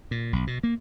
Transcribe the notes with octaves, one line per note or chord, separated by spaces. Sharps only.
A#2
B1
B2
A#3